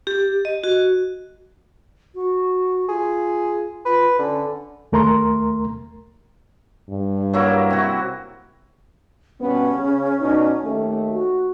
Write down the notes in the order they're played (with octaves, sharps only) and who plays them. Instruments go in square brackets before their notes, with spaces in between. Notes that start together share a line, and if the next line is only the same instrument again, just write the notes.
[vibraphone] G4
D#5
F#4
[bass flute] F#4
[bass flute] F4 [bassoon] G#4
[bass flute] F4 [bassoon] B4
[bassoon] D3 [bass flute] C#4
[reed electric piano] D#2 A3 A#4 A#5 C6
[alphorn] G2
[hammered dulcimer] F#3 A#3 E4
C3 F#4
[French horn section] G2 B2 B3 [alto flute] C#4
[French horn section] C#3
B2 D4 D#4
D#2 A3
[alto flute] F#4